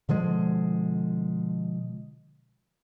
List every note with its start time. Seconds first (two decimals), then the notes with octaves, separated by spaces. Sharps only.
0.09 B2 D3 F3 G#3